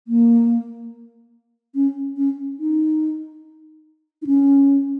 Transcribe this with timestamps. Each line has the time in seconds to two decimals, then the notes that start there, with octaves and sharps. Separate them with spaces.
0.08 A#3
1.75 C#4
2.17 C#4
2.59 D#4
4.22 D#4
4.27 C#4